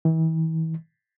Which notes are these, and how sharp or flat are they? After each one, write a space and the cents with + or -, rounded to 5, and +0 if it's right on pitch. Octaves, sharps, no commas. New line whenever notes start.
E3 -40